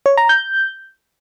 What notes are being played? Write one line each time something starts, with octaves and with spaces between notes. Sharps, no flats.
C#5
A#5
G6